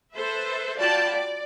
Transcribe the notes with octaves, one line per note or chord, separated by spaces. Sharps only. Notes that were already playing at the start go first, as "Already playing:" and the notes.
A4 B4 C5 E5
F4 F#4 D5 G5 A5 B5
D5